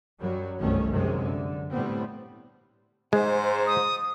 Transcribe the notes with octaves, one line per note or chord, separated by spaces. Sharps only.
F#2 F#3 G3
G1 C2 A2 D#3 A3 C#4
F#2 C3 D#3 G#3
D3
A2 G3 B3 C4
G#2 G#3 C5
D#6